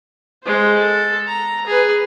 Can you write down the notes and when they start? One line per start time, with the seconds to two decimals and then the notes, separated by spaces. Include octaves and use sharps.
0.43 G#3 C5
0.78 A4
1.27 A#5
1.66 G#4 B4